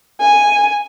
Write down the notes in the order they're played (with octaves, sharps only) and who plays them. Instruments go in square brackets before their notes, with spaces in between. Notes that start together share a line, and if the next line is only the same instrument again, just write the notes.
[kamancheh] G#5